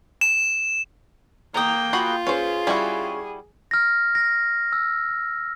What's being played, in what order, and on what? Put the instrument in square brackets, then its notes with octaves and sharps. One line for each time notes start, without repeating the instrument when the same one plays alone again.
[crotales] E7
[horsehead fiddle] A#3 G5 [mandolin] A#5 D#6
[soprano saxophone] F4 [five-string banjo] F#4 [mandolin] G#4 B5 F#6
[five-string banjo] C#4 C5 [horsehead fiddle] G#4 [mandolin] B4
[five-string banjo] G3 E4 F#4 [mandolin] C#4 G5 G#5
[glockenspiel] F6 A#6
A#6
E6